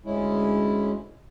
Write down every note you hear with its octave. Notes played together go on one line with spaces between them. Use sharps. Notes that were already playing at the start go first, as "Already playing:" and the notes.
D2 G#3 C#4 E4